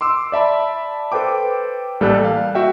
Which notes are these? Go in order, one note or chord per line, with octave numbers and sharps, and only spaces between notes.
C6 D6 E6
D5 E5 A5 B5
A4 B4 C5 G5 D6
A1 G3 A#3 A4 D5 F#6
F5
F#4 E5 G5